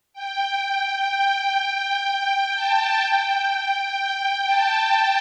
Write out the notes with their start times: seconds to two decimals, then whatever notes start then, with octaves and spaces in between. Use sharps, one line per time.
0.13 G5
1.10 G5
1.58 G5
2.54 A5
3.02 G5
3.98 G5
4.46 A5